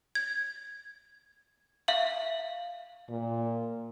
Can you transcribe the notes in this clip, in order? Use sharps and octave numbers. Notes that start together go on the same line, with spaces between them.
G#6
E5 F5 F#7
A#2